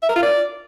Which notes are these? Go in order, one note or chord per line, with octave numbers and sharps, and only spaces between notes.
E5
A#4
F4
D5